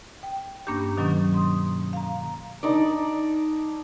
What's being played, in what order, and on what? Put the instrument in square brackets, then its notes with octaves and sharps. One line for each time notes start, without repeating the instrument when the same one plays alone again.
[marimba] G5
G2 A#3 C#4 D4 G4
B2 D#3 F#3 A#3 C#4
C6 D#6
F5 A#5
[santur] D4 D#4 D5